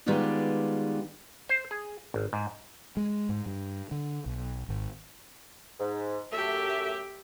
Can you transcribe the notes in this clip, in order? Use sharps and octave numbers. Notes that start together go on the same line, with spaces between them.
D#3 G3 G#3 B3 F4 G#4
C5
G#4
G#1
G#2
G#3
G#2
G2
D3
B1
G#1
G#2
F#2 A3 G4 E5